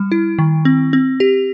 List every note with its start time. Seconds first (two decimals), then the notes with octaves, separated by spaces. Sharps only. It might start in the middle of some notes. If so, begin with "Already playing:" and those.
Already playing: G3
0.12 E4
0.39 D#3
0.65 C4
0.93 C4
1.20 G4